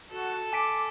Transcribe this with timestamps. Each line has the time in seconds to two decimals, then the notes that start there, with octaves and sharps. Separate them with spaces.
0.11 F#4 A4
0.53 G#5 D6 B6 D7